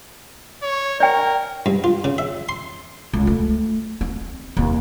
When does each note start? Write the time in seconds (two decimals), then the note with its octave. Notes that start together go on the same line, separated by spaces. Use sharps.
0.62 C#5
1.00 A#4 D5 G5
1.66 G2
1.84 F4
2.04 C#3
2.18 E5
2.49 C6
3.13 C#2
3.27 A3
4.01 C4
4.57 D#2 C4